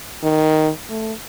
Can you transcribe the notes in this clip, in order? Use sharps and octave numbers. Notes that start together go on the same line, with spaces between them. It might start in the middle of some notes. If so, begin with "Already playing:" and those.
D#3
A3